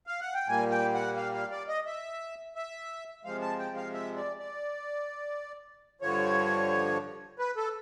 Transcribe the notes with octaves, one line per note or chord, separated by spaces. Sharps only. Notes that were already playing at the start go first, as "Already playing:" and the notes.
F5
F#5
G5
A#2 G3 A#3 G#5
G5
F#5
F5
F5
D5
D#5
E5
E5
C3 F3 G#3 F5
A5
G5
F5
E5
D5
D5
G2 D3 F3 C#5
B4
A4